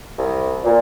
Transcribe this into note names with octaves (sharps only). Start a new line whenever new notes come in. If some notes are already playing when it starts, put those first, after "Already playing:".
C2
A#2